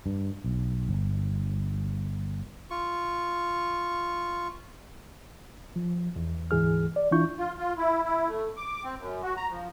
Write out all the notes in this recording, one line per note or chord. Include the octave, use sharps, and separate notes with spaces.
G2
B1
G1
F4 C#6
F3
E2
D2 G#2 E3 G#4 F6
D5
E3 D4 E4 F4 C#6 G6
F4
F4
E4
E4
A3
D6
C4
F#2
F#4
A#5
F3